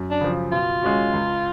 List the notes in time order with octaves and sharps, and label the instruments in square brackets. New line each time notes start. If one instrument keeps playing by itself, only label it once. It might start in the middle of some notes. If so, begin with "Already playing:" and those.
Already playing: [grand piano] F#2
[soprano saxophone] D4
[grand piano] C#3 F3
[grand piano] B2 [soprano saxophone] F4
[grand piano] G#3 C#4 F#4
C#2